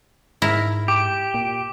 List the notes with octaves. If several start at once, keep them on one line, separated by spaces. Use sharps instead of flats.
G#2 E4 A#4
G4 D6
A#2